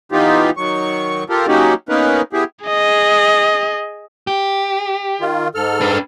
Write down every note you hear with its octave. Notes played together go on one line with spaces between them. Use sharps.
E3 B3 D#4 F4 G4
D#3 F#3 C#6
F4 G4 A4 A#4
F#3 A#3 C#4 D#4 F#4 G4
A#3 B3 C#4 D#4 A#4 B4
B3 E4 G4 G#4
G#4 D#5
G4
D#3 F4
G#2 A4 F6
D4 B4